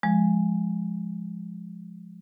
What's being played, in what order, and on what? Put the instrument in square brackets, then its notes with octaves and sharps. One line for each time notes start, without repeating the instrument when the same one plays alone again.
[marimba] F3 G#3